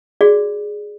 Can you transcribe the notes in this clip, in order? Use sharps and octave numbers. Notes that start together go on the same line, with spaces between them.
F#4 G#4 D5